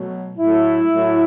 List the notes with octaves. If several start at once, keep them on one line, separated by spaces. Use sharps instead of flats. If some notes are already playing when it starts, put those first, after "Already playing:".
Already playing: B2 F#3 A3
A2 F#3 A3 E4
A2 F#3 A3